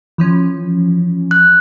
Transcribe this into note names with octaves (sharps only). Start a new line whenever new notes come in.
E3 F3 C#4
F#6